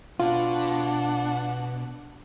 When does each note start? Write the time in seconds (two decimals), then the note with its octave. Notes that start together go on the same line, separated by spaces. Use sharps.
0.20 B2 D4 F4 F#5